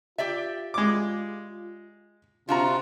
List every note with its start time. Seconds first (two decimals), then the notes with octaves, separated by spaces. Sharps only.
0.18 F4 G4 D5 E5
0.74 G#3 D6
2.49 C3 D4 F4 F#4 A#5